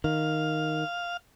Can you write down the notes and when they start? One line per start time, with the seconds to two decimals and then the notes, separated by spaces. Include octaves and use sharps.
0.04 D#3 F5